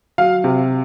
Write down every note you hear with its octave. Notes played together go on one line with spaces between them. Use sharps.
F#3 F5
C3